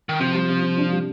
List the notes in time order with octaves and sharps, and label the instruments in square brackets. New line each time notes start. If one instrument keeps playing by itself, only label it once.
[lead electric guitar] D#3
[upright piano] C3 [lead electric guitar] F3
[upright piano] G3
C3
C3
D4
G3